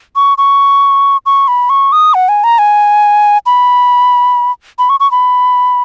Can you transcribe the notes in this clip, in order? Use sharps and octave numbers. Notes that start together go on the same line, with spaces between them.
C#6
C#6
C#6
B5
C#6
D#6
F#5
G#5
A#5
G#5
B5
B5
C#6
C#6
B5